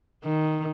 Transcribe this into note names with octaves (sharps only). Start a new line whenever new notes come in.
D#3